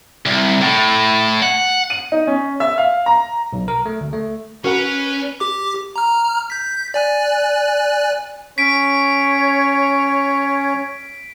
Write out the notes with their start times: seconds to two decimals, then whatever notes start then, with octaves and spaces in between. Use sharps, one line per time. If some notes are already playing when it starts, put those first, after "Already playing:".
0.26 C2
0.61 A2
1.42 F#5
1.90 D#7
2.12 D#4
2.27 C#4
2.60 E5
2.78 F5
3.06 A#5
3.53 B1
3.68 A#4
3.86 A3
4.01 D2
4.13 A3
4.64 C#4 F#4 A#4 B4 F#5
5.40 G4 D6
5.96 A#5 F6
6.50 G6 B6
6.94 D5 G#5 F#6
8.58 C#4 C#5 B6 D7